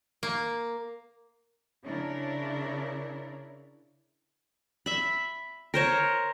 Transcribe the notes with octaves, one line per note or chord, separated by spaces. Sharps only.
A#3
C#3 D4 E4 A#4 C#5
E5 B5
A#4 C5 C#5